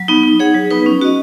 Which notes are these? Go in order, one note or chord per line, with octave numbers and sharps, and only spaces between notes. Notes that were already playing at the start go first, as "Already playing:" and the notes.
Already playing: F#3
B3 D#4
D#4
G#4 C#5 F#5
F#3
B3 D#4 B4
C#4
F#4 D#5